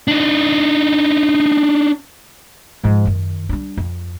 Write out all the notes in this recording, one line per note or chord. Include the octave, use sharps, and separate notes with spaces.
D4 D#4
G#2 F3
F#2 D#3
G3 D4
F2